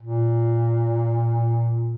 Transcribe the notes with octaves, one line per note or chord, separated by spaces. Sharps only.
A#2